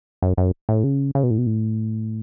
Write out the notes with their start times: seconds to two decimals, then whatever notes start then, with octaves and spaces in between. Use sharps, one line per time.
0.22 F#2
0.37 F#2
0.69 A2
0.84 C#3
1.15 C#3
1.23 B2
1.31 A2
1.38 B2
1.46 A2